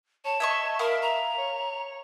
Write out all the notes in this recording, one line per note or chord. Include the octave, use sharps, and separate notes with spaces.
C#5 A5
C#5 D#5 E5 C#6
A#4 F5 B5 D#6
A#5
C#5